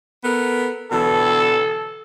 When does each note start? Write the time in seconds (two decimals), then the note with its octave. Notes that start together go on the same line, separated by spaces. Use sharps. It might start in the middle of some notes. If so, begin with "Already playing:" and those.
0.24 B3 A4 A#4
0.91 B2 D3 E3 A4